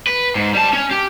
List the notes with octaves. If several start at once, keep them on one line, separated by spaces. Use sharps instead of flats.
B4
G#2
G3 A5
C#4
G4